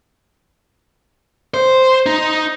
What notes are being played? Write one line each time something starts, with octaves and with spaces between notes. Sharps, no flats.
C5
D#4